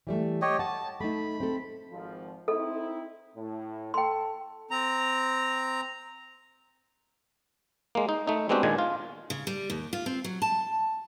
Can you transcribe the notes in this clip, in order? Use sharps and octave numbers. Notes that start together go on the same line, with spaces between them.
E3 G3 A3
G4 C#5 D#5
F#5 A5
A3 D#4 B5
C4 A4
G#1 F3
C4 D#4 E4 A4
A2
A4 G5 C6
C4 A#5
G#3 A#3
D#4
A3 D#4
G#3 B3 C4 D4 F#4 G4
A#2 D#3 G#3 D4 G#5
F4
C#3
G3
D#2
F4
C4
F#3
A5